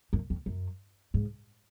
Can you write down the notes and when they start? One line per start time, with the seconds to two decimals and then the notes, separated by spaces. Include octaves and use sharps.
0.13 F#2
0.30 F2
0.46 F#2
1.14 G#2